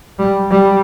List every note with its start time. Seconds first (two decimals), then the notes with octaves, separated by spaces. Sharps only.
0.19 G3
0.51 G3